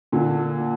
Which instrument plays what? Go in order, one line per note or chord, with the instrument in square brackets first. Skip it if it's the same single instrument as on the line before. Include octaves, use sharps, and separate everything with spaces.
[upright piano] A#2 D3